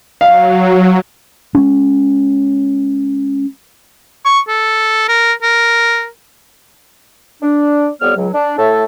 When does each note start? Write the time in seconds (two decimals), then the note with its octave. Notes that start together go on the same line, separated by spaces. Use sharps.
0.21 F#3 F5
1.55 G#3 C#4
4.25 C#6
4.48 A4
5.08 A#4
5.42 A#4
7.42 D4
8.01 F2 G3 B3 C#5 F6
8.16 C#2 F#3
8.33 D4
8.58 A2 A3 A4 C#5 A5